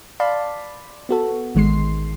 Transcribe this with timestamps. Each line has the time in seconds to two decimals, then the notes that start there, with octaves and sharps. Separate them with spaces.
0.20 D5 F5 A5 B5 C6
1.09 B3 F#4 A4
1.55 A1 D#3 G#3 C6 C7